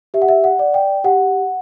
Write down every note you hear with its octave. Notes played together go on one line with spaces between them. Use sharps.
G4 E5
F#5
E5
F#5
D5
G5
G4 F#5